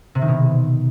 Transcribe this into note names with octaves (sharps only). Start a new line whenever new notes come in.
C3
D#3
B2